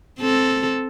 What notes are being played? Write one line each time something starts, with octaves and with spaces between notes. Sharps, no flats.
C4 A4